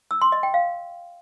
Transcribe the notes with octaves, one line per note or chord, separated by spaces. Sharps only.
E6
C6
D#5
G5
F5